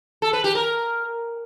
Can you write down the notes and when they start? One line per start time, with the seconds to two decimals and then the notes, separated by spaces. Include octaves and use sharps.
0.22 A4
0.33 B4
0.44 G4
0.55 A#4